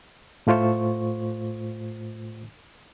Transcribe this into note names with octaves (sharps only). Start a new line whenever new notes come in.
A2 A3 F4 C5 C#6